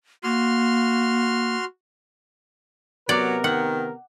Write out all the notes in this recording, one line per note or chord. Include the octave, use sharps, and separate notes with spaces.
A#3 F#4 C6 F6
C3 F#3 B3 A#4 D5
D#3 F#5